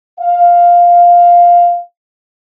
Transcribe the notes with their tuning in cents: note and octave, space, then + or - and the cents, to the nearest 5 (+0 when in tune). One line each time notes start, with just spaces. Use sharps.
F5 +0